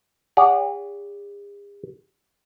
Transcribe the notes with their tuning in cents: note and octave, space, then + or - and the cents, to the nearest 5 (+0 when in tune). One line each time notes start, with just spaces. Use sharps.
G#4 -45 D5 -45 F#5 -15